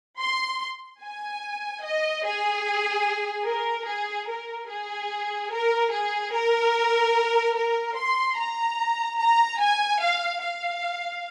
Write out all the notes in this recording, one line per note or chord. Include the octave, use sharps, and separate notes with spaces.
C6
G#5
D#5
G#4
A#4
G#4
A#4
G#4
A#4
G#4
A#4
A#4
C6
A#5
A#5
G#5
F5
F5